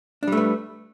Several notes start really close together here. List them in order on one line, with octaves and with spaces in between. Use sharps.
D4 G3 A3 B4